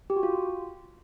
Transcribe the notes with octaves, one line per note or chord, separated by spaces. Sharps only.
G4
F#4
F4